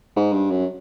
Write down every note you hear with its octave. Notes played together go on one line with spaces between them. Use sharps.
G#2
G2
F#2